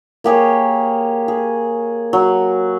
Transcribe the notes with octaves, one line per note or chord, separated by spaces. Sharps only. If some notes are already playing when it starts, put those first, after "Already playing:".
A#3 G4 G#4 C#5
G#4
F#3